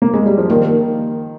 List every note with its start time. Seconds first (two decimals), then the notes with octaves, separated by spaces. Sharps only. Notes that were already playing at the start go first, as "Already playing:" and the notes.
0.02 A#3
0.14 G#3
0.26 G3
0.38 F3
0.50 D#3 A#3